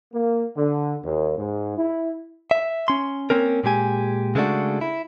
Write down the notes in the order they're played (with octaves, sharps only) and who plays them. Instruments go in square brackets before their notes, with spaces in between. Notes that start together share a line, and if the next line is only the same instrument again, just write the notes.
[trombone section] A#3
D3
D#2
G#2
E4
[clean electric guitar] E5
C#4 C6
A#3 C4 C#4 A#4
A#2 G#3 G4 G#5
C#3 G#3 A3 C#4 D4 F#4
E4